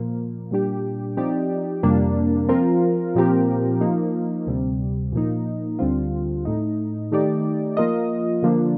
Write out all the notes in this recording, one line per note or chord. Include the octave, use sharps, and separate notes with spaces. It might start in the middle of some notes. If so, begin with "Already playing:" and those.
Already playing: A#2 F3 A#3
A#2 G3 D4 G4
F3 C4 D#4 G4 D5
F2 C3 G3 A#3 D4
F3 C4 F4 A#4
A#2 F3 C4 G4 A#4
F3 A#3 D#4
D2 C3 G3
A#2 F3 A#3 D#4
D2 D3 G3 C4 F4
A2 A3 D#4
D#3 A3 D#4 G4 D5
F3 A#3 F4 A#4 D#5
D3 F3 A#3 D4